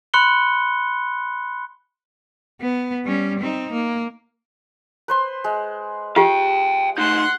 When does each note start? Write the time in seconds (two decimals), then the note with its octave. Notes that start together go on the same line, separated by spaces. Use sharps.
0.14 B5 C6 F#6 C#7 G7
2.61 B3
3.05 G3 C#4
3.40 C4 D#4
3.73 A#3
5.08 B4 C5 C6
5.44 G#3
6.16 F4 G4 F5 G5
6.98 A3 D#4 F#5 C6